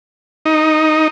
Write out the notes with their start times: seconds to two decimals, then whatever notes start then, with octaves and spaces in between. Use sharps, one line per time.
0.46 D#4